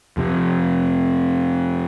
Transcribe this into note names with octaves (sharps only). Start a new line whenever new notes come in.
F2 C3